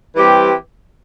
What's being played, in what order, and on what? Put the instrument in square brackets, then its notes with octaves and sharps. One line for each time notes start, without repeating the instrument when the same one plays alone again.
[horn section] E3 G3 C4 G4